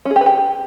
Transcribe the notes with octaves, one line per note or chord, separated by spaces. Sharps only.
C#4
G#4
G4
B4
G4